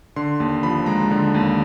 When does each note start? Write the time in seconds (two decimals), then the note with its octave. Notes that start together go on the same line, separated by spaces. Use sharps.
0.16 D3 C6
0.40 D#2
0.63 F3 B5
0.86 G#3 A#5
1.11 D3
1.34 D#2